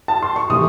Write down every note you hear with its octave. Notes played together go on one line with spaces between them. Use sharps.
A5
C6
C#6
C3 E3 A3 D#6